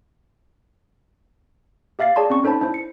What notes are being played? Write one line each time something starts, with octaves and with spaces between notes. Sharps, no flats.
G4 E5 F5 A6 C7
G#4 C#5 D5 A5 A#5 C6
C4 C#4 C#6
D#4 A4 C5 C#5 A5 B5
D4 E4 C5
C#7